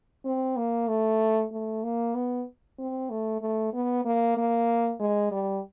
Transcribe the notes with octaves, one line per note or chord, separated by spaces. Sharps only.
C4
A#3
A3
A3
A#3
B3
C4
A3
A3
B3
A#3
A#3
G#3
G3